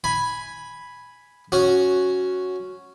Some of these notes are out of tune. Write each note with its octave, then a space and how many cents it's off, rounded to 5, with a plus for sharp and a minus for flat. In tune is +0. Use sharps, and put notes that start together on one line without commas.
G#5 +0 B5 +0
C#4 +0 F#4 -5